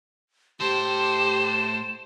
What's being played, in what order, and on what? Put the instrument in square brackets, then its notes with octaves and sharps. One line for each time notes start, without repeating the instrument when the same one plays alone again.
[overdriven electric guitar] A2 A4 [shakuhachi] G4 [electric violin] C5 [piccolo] E7